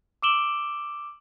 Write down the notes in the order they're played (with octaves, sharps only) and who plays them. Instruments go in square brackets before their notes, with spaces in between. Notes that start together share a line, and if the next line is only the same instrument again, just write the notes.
[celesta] D6 E6 D7 E7 F#7 G7